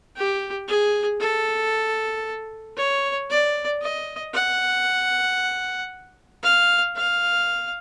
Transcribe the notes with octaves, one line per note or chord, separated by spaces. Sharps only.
G4
G#4
A4
C#5
D5
D#5
F#5
F5
F5